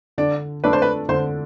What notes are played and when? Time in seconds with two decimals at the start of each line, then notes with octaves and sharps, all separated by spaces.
0.18 D3 D4
0.64 A3 D4 A4 B4 D5
0.73 C5
0.82 B4
1.09 D3 C5